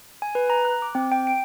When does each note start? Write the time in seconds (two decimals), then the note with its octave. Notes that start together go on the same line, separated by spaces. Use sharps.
0.22 G#5
0.35 B4
0.50 A#5
0.65 F#6
0.82 D6
0.95 C4
1.12 G5
1.27 D7